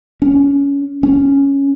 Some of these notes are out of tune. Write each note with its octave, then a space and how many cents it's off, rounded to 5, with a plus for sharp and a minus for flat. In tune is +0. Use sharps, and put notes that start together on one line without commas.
C#4 +20
C#4 +0